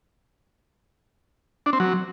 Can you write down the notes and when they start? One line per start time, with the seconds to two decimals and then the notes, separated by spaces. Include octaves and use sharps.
1.66 D4
1.73 C4
1.80 F#3